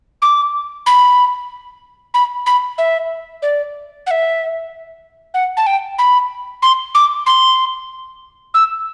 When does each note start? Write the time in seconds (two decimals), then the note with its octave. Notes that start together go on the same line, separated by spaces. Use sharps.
0.22 D6
0.86 B5
2.14 B5
2.46 B5
2.78 E5
3.42 D5
4.07 F#5
4.11 E5
5.34 F#5
5.57 A5
5.67 G5
5.99 B5
6.62 C6
6.95 D6
7.26 C6
8.54 E6